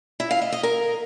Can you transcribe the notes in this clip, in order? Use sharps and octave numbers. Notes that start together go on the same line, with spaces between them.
E4
F5
D#5
D#5
A#4